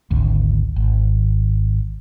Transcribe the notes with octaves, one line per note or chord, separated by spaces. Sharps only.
G#1 D2
G#1